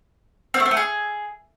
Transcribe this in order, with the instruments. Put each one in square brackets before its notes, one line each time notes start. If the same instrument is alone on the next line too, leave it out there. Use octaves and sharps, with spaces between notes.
[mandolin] C4
A3
C4
A3
G#4